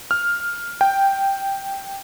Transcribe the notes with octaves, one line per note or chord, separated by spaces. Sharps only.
F6
G5